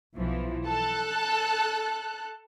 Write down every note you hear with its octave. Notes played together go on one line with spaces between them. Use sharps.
B1 E3 F3
A4 A5 F#6